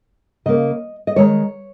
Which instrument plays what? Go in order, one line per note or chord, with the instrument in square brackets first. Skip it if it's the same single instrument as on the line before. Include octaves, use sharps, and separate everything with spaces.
[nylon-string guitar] C#3 A#3 D#5
D#5
D#3 G#3 C#5